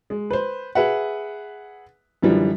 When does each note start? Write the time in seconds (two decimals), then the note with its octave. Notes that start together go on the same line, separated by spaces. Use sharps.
0.10 G#3
0.31 B4 C5
0.75 G#4 B4 E5 F#5
2.22 F#2 D3 E3 F3 G3